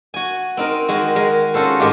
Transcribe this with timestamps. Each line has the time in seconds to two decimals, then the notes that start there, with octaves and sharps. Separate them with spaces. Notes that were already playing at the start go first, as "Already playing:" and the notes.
0.14 F#4 G#5
0.57 C4 D#4 A#4
0.88 D#3 G#3 F#4
1.15 G#3 A#4
1.54 C#4 F4 F#4 A4 C5
1.80 G#2 D#3 G#3 F4 G4